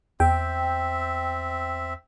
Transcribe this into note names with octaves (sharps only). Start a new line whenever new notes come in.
E2 C4 E5 G5